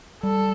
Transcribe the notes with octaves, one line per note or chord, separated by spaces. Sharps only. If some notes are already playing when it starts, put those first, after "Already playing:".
G3 A4